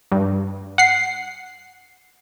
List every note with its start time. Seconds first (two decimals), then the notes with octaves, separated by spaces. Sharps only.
0.12 G2
0.78 F#5 C7